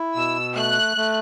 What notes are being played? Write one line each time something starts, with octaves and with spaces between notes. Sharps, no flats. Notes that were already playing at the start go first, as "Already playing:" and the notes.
Already playing: E4
B2 E6
A3 F#6
A3